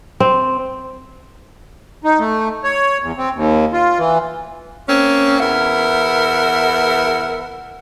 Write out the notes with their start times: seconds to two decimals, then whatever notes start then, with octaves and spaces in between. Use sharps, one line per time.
0.20 C4
2.04 D#4
2.20 A3
2.64 C#5
3.02 E2
3.18 C4
3.35 D#2
3.73 F4
3.98 E3
4.88 A#3 C4 C#4
5.40 E2 A#4 B4 E5 F#5